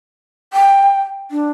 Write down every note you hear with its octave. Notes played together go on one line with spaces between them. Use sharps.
G5
D4